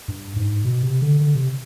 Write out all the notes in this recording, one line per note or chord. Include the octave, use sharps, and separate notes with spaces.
G2
G#2
B2
C3
D3
D3
C3